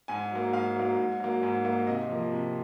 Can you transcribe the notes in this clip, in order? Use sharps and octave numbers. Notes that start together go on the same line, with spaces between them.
G#2 G#5
F#3 A#3
G#2 F5
F#3 A#3
G#2
F#3 A#3
G#2
F#3 A#3
C3 D#5
F3 A#3
C3